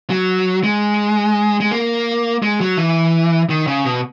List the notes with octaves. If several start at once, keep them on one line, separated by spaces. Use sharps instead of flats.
F#3
G#3
G#3
A#3
G#3
F#3
E3
D#3
C#3
B2